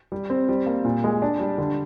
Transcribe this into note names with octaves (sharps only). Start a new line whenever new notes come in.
G3
C4
G3
A#3
A#2
G#3
D4
G3
D3